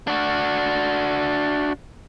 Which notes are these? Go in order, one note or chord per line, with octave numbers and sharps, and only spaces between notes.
D4 F#4